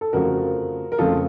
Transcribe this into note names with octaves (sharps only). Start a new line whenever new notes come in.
A4
F2 C#3 F3 A3 F#4 A#4
A#4
F2 C#3 F3 A3 F4 A4